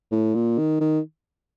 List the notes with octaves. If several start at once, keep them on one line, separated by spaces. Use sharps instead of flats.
A2
A#2
D#3
D#3